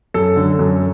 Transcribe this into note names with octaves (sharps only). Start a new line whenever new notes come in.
F#2 A4
D3 F#3
F#2